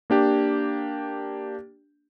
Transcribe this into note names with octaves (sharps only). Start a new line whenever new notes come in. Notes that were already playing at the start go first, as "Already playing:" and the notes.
A#3 D4 G4